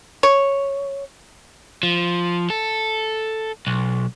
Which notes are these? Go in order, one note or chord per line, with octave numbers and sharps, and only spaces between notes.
C#5
F3
A4
B1